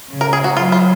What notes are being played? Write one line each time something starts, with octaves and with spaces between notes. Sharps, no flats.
C#3
A#4
G#4
F#4
F#3 F4
F4